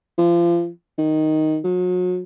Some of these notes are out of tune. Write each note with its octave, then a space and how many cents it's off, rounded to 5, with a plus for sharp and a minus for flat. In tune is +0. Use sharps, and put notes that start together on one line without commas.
F3 -30
D#3 +0
F#3 -35